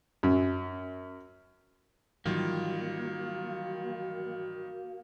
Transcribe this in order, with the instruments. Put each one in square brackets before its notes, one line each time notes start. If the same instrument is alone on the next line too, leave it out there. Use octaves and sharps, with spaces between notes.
[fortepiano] F#2
[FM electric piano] G#2 E3 F#3 [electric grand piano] D#3 G3 F4 [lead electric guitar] A#3 [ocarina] F#4